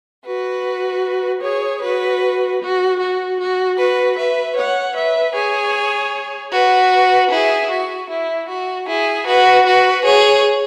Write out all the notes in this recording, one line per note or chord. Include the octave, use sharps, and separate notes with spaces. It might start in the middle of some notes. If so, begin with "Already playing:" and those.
F#4 B4
G#4 C#5
F#4 B4
F#4
F#4
F#4
F#4 B4
B4 E5
C#5 F#5
B4 E5
G#4 C#5
F#4 B4
E4 G#4
F#4
E4
F#4
E4 G#4
F#4 B4
F#4 B4
G#4 C#5